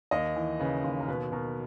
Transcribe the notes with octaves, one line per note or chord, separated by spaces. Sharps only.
D#2 D#5
E3
C#3 B4
D#2
A#4
B2 B4
B2 A#4